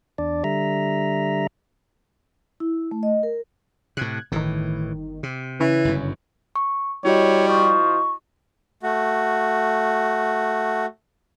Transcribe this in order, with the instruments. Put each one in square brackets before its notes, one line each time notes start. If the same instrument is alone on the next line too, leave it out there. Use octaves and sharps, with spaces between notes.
[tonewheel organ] E2 D4 D5
D3 G3 E5 A#5
[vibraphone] E4
A3
D#5
A#4
[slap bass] A2 C3 [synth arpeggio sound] F#6 G#6
[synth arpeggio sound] G1 D#3 [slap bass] A2 E3
[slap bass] C3
[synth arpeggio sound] C#3 C#4 E4 [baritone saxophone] E3
[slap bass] G1 F#2
[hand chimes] C#6
[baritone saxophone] G3 [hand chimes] E4 F#4 D#5 [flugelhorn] C#5
[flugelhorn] F3 [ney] C#6
[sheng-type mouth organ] A3 F#4